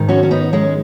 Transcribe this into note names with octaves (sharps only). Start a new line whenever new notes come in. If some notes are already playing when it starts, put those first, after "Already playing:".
Already playing: G#2 D#3
C#4 F#4
C#4
B3 D#4
G#3 C#4